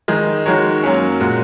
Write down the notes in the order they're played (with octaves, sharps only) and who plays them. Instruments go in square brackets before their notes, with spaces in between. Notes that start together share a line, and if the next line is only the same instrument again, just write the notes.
[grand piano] D#3 G#3 D#4
D#3 G#3 F#4 A#4 C#5
F#2 F#3 A#3 C#4
A#2 G#3 F#4 A#4